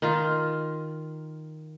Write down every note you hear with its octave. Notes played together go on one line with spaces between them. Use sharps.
D#3 F4